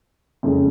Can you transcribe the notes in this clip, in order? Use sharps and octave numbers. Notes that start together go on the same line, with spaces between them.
F#1 F2 C#3 G#3